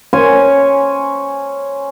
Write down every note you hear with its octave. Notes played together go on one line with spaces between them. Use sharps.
C#4 C5 C#5 G#5